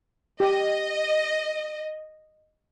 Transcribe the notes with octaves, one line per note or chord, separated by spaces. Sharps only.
G4 D#5